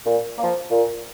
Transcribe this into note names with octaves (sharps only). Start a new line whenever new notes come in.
A#2
F3 A#3
A#2